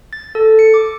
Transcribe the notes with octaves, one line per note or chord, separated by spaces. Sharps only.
A6
A4
C#7
D6